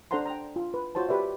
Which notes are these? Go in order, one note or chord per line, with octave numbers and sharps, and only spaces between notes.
D4 A4 C5 F#5 A#5 C6
G5 A#5
F4
B4
F4 F#4 C5 C#5 A5
G4 B4 D5 E5